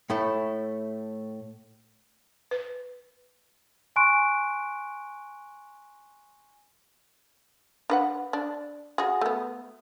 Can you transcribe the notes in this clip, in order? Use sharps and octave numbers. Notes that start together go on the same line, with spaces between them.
A2 A3 E4
B4
G#5 C6 C#6 F#6 D7
D4 B4 F#5
D4
F#4 G#4
A3 B3